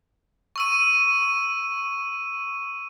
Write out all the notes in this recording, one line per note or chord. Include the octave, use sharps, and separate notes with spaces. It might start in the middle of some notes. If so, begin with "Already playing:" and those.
C#6 E6 D#7